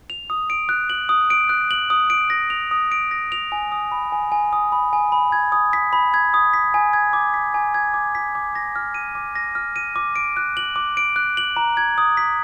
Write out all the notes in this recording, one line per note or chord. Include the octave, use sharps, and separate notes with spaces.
F7
D#6
D7
F#6
F#7
D#6
D7
F#6
F#7
D#6
D7
A#6
F7
D#6
D7
A#6
F7
G#5
D#6
B5
G#5
G#5
D#6
B5
G#5
B5
G#6
D#6
B6
B5
G#6
D#6
B6
G#5
G#6
D6
B6
G#5
G#6
D6
B6
D6
A#6
F6
D#7
D6
A#6
F6
D#7
D6
D7
F#6
F#7
D6
D7
F#6
F#7
A#5
G#6
D#6
B6